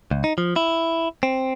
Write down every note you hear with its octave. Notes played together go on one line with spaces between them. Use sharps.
C#2
D#4
F3
E4
C4